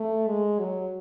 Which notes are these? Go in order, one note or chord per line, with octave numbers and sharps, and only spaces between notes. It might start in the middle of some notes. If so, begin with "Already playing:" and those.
Already playing: A3
G#3
F#3